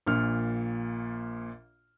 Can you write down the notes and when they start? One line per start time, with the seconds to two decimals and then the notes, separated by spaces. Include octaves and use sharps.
0.06 A#1 A#2 F6